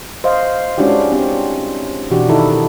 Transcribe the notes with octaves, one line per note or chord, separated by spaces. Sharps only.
C5 D#5 F5
G#3 C#4 D4 E4 F#4 G4
C4 D4 G4
B2 E3 D4 F#4 G4
D#3 D#4 E4 A4